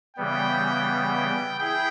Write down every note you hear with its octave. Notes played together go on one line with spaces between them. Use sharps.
C#3 E3 G3 B3 G5
E4 G#4 G5